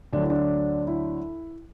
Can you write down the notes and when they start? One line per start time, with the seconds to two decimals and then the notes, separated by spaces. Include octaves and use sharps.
0.13 D2 D3 F#3 D4
0.22 E4
0.30 D4
0.87 E4